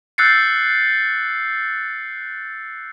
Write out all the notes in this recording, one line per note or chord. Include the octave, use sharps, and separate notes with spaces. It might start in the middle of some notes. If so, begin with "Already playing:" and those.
E6 F#6 G6 A6 C7 C#7